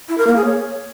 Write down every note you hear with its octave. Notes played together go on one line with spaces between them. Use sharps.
E4
A#4
A#3
G#4
C#5